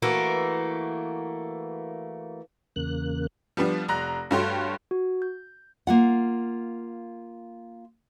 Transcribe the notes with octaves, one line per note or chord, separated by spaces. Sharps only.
E3 A3 A#3 F#4
E2 C#3 A#3 F#6
F3 G3 B3 D4
F1 A#5 F#6 A#6
G2 A3 F#4 C#5 G5 C6
F#4
G6
A#3 F4 F#5